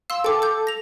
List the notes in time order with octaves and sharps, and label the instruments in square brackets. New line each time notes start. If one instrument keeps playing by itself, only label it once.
[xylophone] F5 C6 [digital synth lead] E6
[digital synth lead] A4 [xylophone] G5 D6
[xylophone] D6 G6
A#6 F7